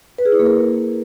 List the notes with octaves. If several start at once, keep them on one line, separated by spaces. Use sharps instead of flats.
B4
G#4
E4
A#3
A#4